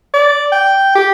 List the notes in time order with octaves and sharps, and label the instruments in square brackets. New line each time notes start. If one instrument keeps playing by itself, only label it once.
[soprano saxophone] D5
G5
G4